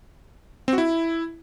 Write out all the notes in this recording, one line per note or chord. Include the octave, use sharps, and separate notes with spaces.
C4
F#4
E4